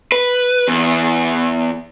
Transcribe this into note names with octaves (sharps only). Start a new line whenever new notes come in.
B4
E2